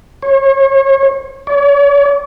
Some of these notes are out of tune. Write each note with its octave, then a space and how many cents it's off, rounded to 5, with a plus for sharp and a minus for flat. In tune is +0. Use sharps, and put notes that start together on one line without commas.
C#5 -35
C#5 +45